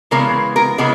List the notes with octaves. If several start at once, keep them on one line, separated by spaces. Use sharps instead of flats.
C#3 E3 G#3 B3 A#4
A#4
C#3 E3 G#3 B3